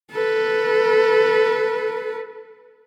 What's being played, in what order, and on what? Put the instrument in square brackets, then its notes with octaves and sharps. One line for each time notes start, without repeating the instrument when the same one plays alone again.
[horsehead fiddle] A4 B4